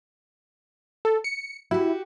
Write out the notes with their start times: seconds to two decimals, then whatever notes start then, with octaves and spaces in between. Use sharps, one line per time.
1.05 A4
1.24 C#7
1.71 E4 F#4 G4